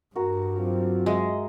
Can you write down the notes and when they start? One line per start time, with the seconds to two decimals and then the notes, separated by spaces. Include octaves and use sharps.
0.16 G2 F#4 A#4
0.57 F#3 C4 F4
1.06 G#3 D#5 E5 F#5